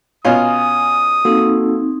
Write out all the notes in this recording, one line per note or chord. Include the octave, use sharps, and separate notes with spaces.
B2 C#4 F4 G#5 D#6
A#3 C4 D#4 F#4 A4